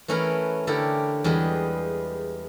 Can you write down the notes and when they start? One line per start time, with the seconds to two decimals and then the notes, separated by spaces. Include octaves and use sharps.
0.08 E3 A3 C#4 E4 A#4 B4
0.67 D3 C#4 E4 G4 A4 A#4
1.24 E2 G3 G#3 G#4 B4